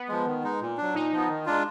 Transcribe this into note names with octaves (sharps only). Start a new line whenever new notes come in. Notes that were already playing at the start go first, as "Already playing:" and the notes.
Already playing: B3
F3 G#3
D#3
G#3 D#4
A#2
F#3 D4
A#2 D#4
F3 B3
D#3
G#3 D4 F4